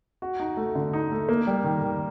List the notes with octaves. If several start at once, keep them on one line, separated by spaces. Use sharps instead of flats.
F#4
D#4
A3
D3
D#4
A3
A#3
G3
D#3
D#3